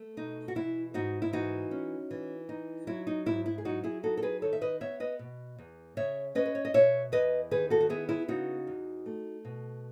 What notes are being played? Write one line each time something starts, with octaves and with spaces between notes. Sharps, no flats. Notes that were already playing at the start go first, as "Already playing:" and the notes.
Already playing: A3
B2 D#4
F#4
E3 E4
G#2 D#4 F#4
E4
E3 D#4 F#4
C#4
E3
D#4
F#3 E4
D#4
G#2 E4
E4
G#4
F#3 D#4 F#4
E4 G#4
D#4 F#4 A4
A4
G#4 B4
D#3 A4 C#5
E5
B4 D#5
B3 C#5 E5
B4 D#5
B2
E2
C#3 C#5 E5
C#4 B4 D#5
B4
C#5
D#5
B2 C#5 E5
E2 B4 D#5
D#3 G#4 B4
F#4 A4
F#4
B3 E4 G#4
E4 G#4
C#3 D#4 F#4
E2
A3
B2